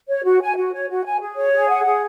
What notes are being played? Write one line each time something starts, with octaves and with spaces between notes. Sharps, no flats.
C#5
F#4
G#5
F#4
C#5
F#4
G#5
G#4
C#5
G#4
F#5
G#4